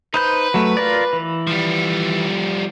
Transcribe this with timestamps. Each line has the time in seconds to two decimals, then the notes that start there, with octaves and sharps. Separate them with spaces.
0.14 D#4 B4 C5 G6
0.54 F#3 A3
0.77 F4 A#4 D5
1.13 E3
1.47 F3 G3